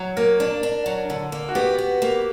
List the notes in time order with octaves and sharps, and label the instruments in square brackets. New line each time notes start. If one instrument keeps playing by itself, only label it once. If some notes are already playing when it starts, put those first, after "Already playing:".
Already playing: [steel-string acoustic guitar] F#3
[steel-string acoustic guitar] A#3 [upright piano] A#4
[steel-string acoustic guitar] D4
D4
F#3
D3
A#3
[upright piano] F#4
[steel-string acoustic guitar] B3 [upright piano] G4
[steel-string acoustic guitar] B3
A#3